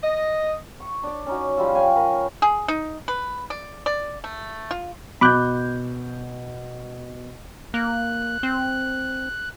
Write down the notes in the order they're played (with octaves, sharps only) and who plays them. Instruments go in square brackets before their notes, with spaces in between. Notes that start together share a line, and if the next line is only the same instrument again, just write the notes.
[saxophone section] D#5
[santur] C#6
D4 D5
C#4 D#4 F#4
F3 G3 F4 E6
C#5 F5 G5 G#5
A#4 B5
[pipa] G#4
D#4
B4
D5
D5
A3
F4
[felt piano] B2 G6 [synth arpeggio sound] B5 D6 F#6
[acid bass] A#3 [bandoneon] F#6
[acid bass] C4